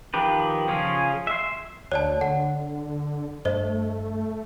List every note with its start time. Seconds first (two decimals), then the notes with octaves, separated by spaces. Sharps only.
0.14 D#3 F3 G4 B4
0.68 C#3 F3 C#4 F4 G#4
1.27 E5 C6
1.92 D2 C#5 D5 A5
2.21 D3 F#5
3.45 G2 A3 C5 D#5